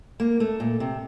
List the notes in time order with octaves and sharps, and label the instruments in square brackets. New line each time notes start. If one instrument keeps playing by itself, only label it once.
[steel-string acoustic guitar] A#3
A3
A#2
C3